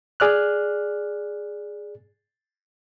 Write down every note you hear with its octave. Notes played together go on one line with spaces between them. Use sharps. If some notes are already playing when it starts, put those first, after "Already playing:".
G#4 D5 F6 F#6